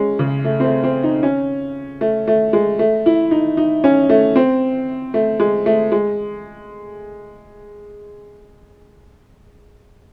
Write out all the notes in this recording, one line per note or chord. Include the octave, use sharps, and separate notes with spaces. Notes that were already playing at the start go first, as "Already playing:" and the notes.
Already playing: G#3 C#4
C#3
A3
C4
A3
C4
D#4
C#4
A3
A3
G#3
A3
E4
D#4
D#4
C#4
A3
C4
A3
G#3
A3
G#3